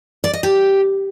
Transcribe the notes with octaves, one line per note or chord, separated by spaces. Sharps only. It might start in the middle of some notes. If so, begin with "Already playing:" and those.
D5
D#5
G4